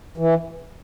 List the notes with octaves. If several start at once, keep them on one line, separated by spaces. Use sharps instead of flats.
E3